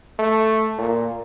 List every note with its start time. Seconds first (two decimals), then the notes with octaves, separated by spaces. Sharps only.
0.19 A3
0.78 A#2